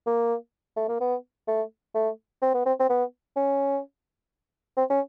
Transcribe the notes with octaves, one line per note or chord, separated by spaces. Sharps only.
A#3
A3
A#3
B3
A3
A3
C4
B3
C4
C4
B3
C#4
C4
C#4